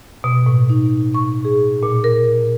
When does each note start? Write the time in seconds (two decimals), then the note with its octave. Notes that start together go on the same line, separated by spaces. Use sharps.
0.24 B2
0.46 A2
0.70 D#4
1.15 C#6
1.45 G#4
1.83 A#2
2.04 A#4